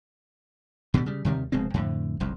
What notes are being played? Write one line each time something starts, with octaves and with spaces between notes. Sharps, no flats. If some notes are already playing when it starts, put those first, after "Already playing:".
B2 D3 F#3 G3
C#3 G3
D#2 C3 D#3 G3
F1 B2 G#3 C4
F2 A2 D3
F#1 C2 F2